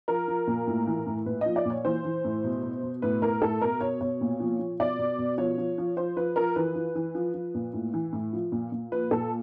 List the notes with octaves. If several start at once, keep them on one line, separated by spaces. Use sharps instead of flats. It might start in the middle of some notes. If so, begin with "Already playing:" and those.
F3 A#4
F3
A#2
A2
E3
A2
A#2 B4
F3 D#5
D5
A#2 C#5
E3 C5
E3
A2
B2
B2
B2
A2 B4
A2 A#4
A2 A4
B2 A#4
B2 C#5
B2 C#5
A#2
F3
F3
B2 D5
B2
B2
F3 C#5
F3
F3
F3 C5
F3 B4
F3 A#4
E3 B4
E3
E3
F3
F3
A#2
A2
E3
A2
F3
A#2
A#2
F3 B4
A#2 A4